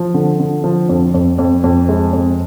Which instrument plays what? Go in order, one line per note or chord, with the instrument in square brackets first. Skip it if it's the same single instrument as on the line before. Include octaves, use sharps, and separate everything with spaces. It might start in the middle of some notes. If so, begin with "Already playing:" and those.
Already playing: [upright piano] F3
D3
D3
F3
F2
F2
F2
F2
G#3
F2